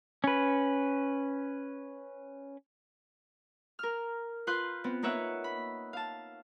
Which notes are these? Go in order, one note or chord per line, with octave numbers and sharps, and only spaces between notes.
C#4 B4
A#4 F6
F4 B4 C6 F#6 G6
B3 C4
A#3 D#4 B4 C#5 E5 F#5
B5
F5 A5